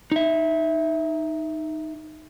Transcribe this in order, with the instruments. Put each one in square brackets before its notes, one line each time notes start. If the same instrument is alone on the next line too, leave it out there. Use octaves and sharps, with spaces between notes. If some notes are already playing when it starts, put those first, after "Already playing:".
[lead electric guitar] D#4 E5